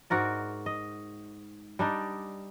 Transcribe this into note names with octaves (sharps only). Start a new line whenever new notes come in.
G#2 F#4 A#4 D5
D#5
G3 D4 D#4